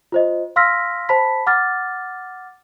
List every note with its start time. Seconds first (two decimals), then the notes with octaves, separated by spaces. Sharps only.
0.12 F4 C5 D#5
0.56 F5 C6 E6 F6 A#6 B6
1.09 C5 A5 B5 B6
1.47 F#5 D6 F6 A6